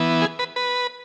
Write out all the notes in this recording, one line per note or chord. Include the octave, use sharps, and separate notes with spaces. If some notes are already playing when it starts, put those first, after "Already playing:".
Already playing: E3 B3
G#4
B4
B4